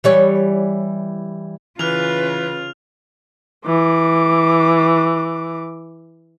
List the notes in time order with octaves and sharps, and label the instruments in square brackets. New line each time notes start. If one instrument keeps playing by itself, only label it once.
[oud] E3 G3 C#5
[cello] C#3 F4 [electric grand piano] E3 [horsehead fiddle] B4 [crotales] F6 F7
[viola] E3 D6